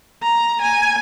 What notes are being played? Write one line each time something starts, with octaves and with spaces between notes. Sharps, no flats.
A#5
G#5